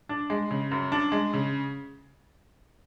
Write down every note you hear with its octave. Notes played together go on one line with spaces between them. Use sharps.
D4
G#3
C#3
F#2
D4
G#3
C#3